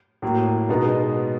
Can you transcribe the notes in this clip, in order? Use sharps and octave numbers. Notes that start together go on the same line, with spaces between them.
A2 F#3 A#3
B2 G#3 B3 D#4